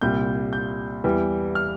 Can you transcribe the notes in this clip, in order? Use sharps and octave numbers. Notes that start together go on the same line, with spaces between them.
C2 A#2 G3 G6
G6
E2 E3 G3
F6